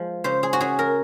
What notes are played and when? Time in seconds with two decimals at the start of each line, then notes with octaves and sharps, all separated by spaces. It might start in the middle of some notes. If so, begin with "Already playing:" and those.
Already playing: F3 G#3
0.24 C#3 C5
0.43 G#4
0.53 F#4
0.61 C#4 G#4
0.79 A#4